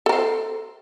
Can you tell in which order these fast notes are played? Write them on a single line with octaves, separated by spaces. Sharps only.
A4 A#4 C5